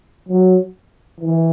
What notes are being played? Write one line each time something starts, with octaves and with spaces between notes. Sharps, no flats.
F#3
E3